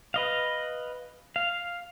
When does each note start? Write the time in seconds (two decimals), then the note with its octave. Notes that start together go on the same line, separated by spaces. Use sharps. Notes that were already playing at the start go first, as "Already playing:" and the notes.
0.14 B4 D#5 F5
1.36 F5